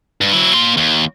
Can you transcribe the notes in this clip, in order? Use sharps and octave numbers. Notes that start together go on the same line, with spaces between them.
G2
F#3 E4
A#3 C6
D#2